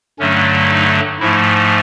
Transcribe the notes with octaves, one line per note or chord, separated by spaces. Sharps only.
G2 D3 F#3 A3 C#4
D#4
G#2 F3 A3 E4